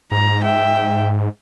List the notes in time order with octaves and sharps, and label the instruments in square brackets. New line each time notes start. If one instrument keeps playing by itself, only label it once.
[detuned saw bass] G#2 [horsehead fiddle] A#5
[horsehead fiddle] E5 G5